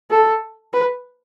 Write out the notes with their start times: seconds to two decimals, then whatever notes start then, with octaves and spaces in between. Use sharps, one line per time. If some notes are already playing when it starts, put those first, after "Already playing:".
0.11 A4
0.73 B4